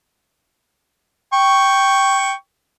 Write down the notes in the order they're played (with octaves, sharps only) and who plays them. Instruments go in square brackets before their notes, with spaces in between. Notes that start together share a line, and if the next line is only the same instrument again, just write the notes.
[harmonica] G5 C#6